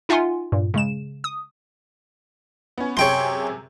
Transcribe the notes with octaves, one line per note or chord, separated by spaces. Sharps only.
D#4 F4 E5 F#5 G#5 C6
G2 A#2
C#3 G#3 E7
D#6
B3 C#4
F#2 C3 G#4 C#5 G5 C6